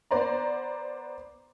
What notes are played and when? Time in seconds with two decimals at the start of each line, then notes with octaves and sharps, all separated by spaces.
0.11 B3 C5 D5 A#5